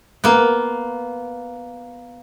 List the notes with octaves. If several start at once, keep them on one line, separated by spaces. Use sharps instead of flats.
A#3 B3